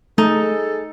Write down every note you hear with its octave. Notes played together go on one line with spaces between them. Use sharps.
A3 D#4 G#4 A4